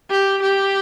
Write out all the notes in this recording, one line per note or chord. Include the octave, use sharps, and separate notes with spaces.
G4
G4